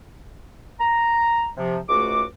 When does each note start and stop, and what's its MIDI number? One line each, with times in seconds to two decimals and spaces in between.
0.81 1.49 82
1.58 1.80 48
1.58 1.80 53
1.89 2.24 37
1.89 2.24 44
1.89 2.24 57
1.89 2.24 66
1.89 2.24 86